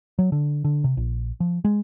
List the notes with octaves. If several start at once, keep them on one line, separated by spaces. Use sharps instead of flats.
F#3
D3
D3
C3
A#1
F3
G#3